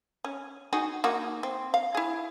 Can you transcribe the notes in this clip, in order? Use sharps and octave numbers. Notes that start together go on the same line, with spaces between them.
C#4
D#4 F#4 G#4
A#3 D#4 F#4
C4
F5
E4 G#4